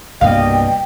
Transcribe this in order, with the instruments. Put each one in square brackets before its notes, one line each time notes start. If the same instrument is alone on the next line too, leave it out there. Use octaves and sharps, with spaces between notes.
[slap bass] C2 G2 A#3 [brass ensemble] B2 D5 D#5 [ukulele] F5 [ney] G5